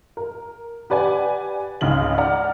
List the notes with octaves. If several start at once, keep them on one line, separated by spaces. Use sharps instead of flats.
A#4
G4 B4 D5 F#5 G#5
C#2 G#2 C#3 G#3 F#7
D5 F#5 A#5 F6